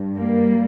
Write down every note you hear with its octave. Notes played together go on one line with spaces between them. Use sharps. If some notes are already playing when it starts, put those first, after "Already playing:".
Already playing: G2
G3 A#3